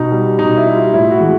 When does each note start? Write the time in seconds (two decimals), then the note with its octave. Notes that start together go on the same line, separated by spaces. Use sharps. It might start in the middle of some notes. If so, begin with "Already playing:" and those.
Already playing: B2 D#4
0.12 G3
0.39 B2 D#4
0.58 E4
0.67 G3
0.75 F4
0.93 A2 E4
1.11 F#4
1.20 E3 G#3